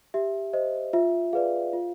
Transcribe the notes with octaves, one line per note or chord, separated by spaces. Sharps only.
G4 E5
C5 D#5
F4 E5
G#4 B4 D5 F5
F4